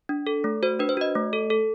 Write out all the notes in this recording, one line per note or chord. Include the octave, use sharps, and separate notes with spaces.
D4
A4
A3
F#4 C5
D4 B4
C5
F#4 D#5
A3
A4
A4